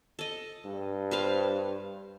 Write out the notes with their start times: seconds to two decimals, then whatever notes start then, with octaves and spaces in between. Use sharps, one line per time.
0.19 A4 D#5
0.65 G2
1.11 B4 C5 F5